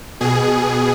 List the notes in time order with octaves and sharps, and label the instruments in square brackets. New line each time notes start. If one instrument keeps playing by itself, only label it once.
[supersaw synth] B2 G#4